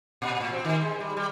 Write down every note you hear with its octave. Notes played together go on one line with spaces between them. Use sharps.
A#2
A2
C4
D#3
G#3
G3
G3